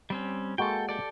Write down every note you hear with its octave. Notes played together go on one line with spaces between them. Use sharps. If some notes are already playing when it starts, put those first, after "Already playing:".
G3 C4 C#4
G#3 A#3 F#4 A4 G5
G4 A4 D5